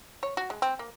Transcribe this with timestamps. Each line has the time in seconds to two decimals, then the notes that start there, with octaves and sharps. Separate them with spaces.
0.23 C#5
0.37 F#4
0.50 G#3
0.62 C4
0.79 A#3